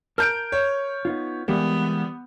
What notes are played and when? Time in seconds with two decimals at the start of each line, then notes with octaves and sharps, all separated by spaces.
0.18 A#4 A5 A#5 F6 G6 D7
0.52 C#5
1.05 B3 D#4 F4
1.48 E3 G3 G#3 A#3 B3